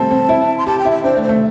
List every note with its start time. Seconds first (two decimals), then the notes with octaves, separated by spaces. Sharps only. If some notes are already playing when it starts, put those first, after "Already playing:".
Already playing: G3 A3 C4 A5
0.11 C4
0.29 E4
0.58 C6
0.66 G4 A5
0.79 G5
0.85 E4
0.91 E5
1.04 D4 C5
1.17 A3
1.22 C5
1.29 A3